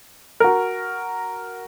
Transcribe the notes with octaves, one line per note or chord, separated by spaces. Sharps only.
F#4 A#4